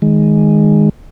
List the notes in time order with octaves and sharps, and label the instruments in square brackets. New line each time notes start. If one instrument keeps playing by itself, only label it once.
[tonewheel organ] D#3 G#3